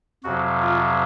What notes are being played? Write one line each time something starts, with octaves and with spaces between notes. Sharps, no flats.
F2 C3 F#3 F#4
F4